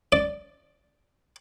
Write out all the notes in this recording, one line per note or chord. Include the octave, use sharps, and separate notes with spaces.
D5